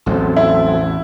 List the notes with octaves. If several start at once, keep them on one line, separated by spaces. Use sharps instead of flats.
A1 E2 F#3 C4 A4
E4